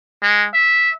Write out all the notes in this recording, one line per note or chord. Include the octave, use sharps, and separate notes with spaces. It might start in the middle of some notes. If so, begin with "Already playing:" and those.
G#3
E5